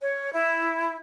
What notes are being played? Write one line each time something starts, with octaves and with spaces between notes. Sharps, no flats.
C#5
E4